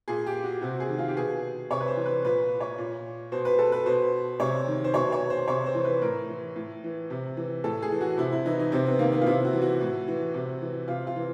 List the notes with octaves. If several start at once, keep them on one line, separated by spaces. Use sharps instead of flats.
A#2 G#4
G4
F#4
C3 F#4
G#4
D#3
F4
G4
B2 G#4
C3 C#5
B4
C5
E3
B4
A#2 B4
C#5
A#2
B2 C5
B4
A4
B4
B2 C5
C3 C#5
D#3
C5
B2 C#5
C#5
C5
C3 C#5
C5
E3
C5
B4
A2 A#4
E3
A2
E3
C3
E3
A2 A4
G#4
E3
F#4
C3 E4
E4
E3 D#4
D#4
C3 C4
B3
D#3 A#3
B3
F4
C3 E4
F#4
E3
F#4
A2
E3
C3
E3
C3 F4
F4
E3